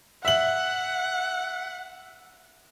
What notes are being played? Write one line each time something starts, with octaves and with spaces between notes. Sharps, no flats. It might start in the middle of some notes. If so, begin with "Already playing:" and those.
E5 F#5 F#7